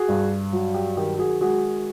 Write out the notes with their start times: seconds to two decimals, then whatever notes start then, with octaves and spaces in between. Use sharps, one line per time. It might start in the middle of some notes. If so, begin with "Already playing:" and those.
Already playing: F#4 G#4
0.08 G2
0.53 F#3
0.74 G4
0.97 D#3 G4
1.18 F#4 G#4
1.41 G#3 F#4 G#4